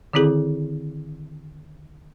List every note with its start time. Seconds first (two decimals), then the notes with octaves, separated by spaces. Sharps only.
0.13 D3 D#3 C4 E4 G#4 A4